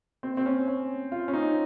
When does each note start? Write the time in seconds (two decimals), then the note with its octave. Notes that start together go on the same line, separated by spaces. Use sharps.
0.23 C4
0.37 C4
0.46 C#4
0.68 C#4
1.12 F4
1.28 C#4
1.34 D#4